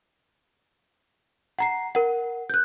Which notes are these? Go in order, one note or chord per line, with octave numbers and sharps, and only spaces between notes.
F#5 A#5 C7
A#4 F#5
F#6 G6